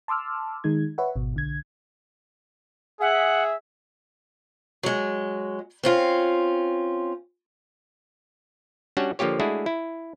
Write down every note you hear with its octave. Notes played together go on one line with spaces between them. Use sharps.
A5 C6 D6 E6 F6
D#3 G#3 D#4 G#6
B4 C#5 E5 F#5
G#1 B2
B1 D3 G#6
G#4 E5 F#5
F#3 G#3
C4 C#4 F4
G3 C#4 D4 F#4 C#5 F#5
D3 F3 A#3 F4 G4 C#5
G#3 A3 D4 E4 F#4 G#4
E4